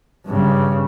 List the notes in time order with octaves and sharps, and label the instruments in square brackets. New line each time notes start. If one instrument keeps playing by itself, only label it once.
[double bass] G2 C#3